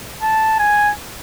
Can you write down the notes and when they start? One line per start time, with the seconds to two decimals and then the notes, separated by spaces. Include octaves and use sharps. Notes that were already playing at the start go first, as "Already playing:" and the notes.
0.22 A5
0.59 G#5